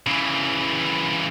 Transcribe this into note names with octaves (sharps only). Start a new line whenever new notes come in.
C#3 E3